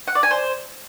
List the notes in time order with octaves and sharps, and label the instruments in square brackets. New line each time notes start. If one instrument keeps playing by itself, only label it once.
[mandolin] F#5
D5
G#5
C5